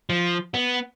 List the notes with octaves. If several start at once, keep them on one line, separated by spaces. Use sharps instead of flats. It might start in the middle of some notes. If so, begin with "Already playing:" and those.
F3
B3